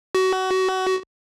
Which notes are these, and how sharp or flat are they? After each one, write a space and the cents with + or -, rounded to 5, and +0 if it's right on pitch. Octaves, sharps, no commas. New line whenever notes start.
F#4 +25